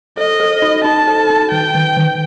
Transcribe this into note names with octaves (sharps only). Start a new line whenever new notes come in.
A4 D#5
A4
D#4
D#4 A5
A4
D#4
D#3 G5
D#3
D#3